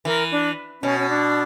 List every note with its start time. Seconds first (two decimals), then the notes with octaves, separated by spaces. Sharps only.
0.05 E3 A#4
0.32 D4
0.82 B2 C#4
0.99 C#4
1.09 D4